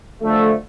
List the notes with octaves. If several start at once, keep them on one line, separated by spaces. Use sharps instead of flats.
D3 F3 A3